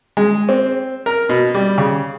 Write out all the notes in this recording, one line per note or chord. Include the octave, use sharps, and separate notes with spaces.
G#3
C4
A#4
B2
G3
C#3